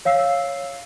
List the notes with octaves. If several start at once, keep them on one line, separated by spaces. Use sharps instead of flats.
C#5 F5 E6 C7